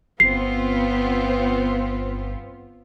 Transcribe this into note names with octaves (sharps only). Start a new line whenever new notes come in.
G1 B3 C4 F4 C7